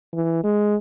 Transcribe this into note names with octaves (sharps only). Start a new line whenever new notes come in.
E3
G#3